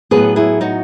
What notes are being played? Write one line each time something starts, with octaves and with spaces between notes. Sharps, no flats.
A2 F#3 B3 G#4 B4
E4 G#4
D#4 F#4